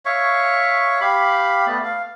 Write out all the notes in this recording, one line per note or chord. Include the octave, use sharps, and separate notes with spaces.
C#5 E5 F5 C#6
G4 F5 B5
A3 B3 D5
F5